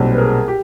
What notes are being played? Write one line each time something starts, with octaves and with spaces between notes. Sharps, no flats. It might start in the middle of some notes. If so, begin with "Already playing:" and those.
Already playing: B1 A#2 G3 C4
B4
G#4 A#4
G4